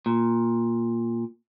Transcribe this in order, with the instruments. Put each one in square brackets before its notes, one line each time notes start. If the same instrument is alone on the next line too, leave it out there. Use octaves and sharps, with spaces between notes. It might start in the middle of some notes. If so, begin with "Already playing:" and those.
[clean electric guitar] A#2